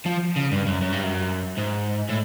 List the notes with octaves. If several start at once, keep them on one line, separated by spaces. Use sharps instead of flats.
F3
C#3
G2
F#2
F#2
G2
F#2
G#2
A2